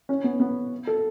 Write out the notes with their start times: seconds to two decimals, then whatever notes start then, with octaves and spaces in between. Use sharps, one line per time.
0.09 C#4
0.24 B3
0.40 B3
0.87 A4